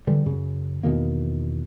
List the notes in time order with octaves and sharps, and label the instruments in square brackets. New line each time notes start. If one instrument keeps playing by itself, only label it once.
[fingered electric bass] D3 E3 G3
F#2 C#3
E2 B2 D#3 A#3